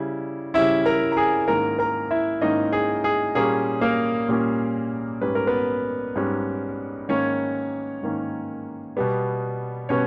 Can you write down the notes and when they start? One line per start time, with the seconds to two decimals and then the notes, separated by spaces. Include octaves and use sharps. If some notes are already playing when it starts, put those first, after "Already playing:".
Already playing: C#3 G3 C#4 E4
0.54 C#3 G3 C#4 E4 E5
0.85 A#4 A#5
1.12 A#5
1.17 G#4 G#5
1.48 G#2 D#3 A#3 C#4 A#4 A#5
1.79 A#4 A#5
2.11 E4 E5
2.41 G#2 D#3 A#3 C#4 D#4 D#5
2.72 G#4
3.04 G#4
3.35 A#2 G3 A#3 C#4 G#4
3.81 A#3 A#4
4.28 A#2 G3 A#3 C#4
5.22 G#2 G3 C#4 B4
5.35 A#4
5.47 B3 B4
6.16 G#2 G3 C#4
7.09 G#2 D#3 A#3 C#4 C#5
8.02 G#2 D#3 A#3 C#4
8.97 B2 G3 B3
9.89 B2 G3 B3 C#4 C#5